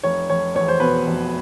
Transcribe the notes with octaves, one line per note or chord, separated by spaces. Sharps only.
F1 C#5
F1 C#5
E2 C#5
C5
B2 B4
F1